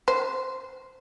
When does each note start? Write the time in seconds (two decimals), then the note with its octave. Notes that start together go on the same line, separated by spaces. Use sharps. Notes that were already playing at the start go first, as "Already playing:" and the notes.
0.08 C5